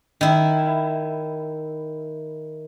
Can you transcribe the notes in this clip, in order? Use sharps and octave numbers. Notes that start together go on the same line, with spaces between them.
D#3 E4